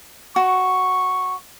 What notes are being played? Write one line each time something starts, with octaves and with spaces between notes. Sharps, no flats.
F#4 C#6